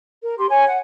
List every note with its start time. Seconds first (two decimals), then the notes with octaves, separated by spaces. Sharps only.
0.21 A#4
0.38 G4 C6
0.49 C#5 G#5
0.67 F#5